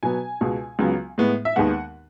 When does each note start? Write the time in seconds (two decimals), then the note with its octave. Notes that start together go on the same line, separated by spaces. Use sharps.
0.03 B2 F#3 B3 G#5
0.41 C#2 B2 G#3
0.79 C#2 C#3 F#3 B3
1.18 A2 G#3 B3
1.45 E5
1.56 D#2 D#3 G#3 B3 F#5